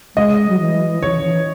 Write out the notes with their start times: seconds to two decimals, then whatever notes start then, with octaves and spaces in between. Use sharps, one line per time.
0.16 G#3 D#5
0.49 F#3
0.60 E3
1.02 E3 C#5
1.24 E3